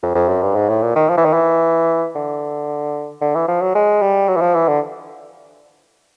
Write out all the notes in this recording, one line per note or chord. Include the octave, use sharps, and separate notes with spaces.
F2
F2
F#2
G2
G#2
A2
A#2
D#3
F3
E3
D#3
E3
D3
D3
E3
F3
F#3
G#3
G3
F#3
E3
F3
E3
D3